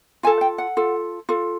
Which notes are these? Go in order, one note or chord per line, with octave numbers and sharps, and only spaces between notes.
F4 A4 G#5
G5
F#5
F4 A4
F4 A4